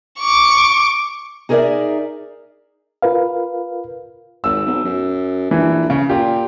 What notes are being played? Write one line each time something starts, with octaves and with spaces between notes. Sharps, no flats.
C#6 D6
D#4 G#4 A#4 C5 D5 E5
F4 A#4 B4 F5
G#1 E6
B1
F#2
A#1 E3
C#3
A#2 G4